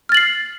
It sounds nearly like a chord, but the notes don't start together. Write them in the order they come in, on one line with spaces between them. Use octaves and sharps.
F6 A6 F#7 C7